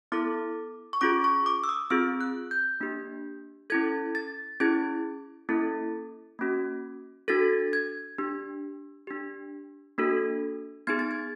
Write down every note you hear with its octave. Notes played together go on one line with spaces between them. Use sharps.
B3 E4 A4 D6
C#6
C#4 F4 G#4 D6
C#6
D6
E6
D#6
C4 F4 G#4 E6
F#6
G6
A#3 D4 G4
C#4 E4 A4 G#6
A6
C#4 E4 G#4 G#6
A#3 C#4 E4 A4
A#3 C#4 F#4
D4 F#4 A4 A6
G#6
D4 G4
D4 G4
A#3 D4 F#4 A4
B3 D#4 G#4 G#6
A6
G#6